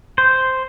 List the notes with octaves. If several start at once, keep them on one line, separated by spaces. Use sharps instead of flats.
C5